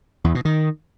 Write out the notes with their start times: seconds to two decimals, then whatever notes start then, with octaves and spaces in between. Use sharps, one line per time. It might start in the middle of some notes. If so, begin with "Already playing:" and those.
0.24 E2
0.35 B2
0.45 D#3